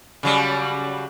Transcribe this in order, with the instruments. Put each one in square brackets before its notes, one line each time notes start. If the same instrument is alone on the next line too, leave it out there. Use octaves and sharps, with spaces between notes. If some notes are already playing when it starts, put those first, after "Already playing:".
[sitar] C#3 F#3 G3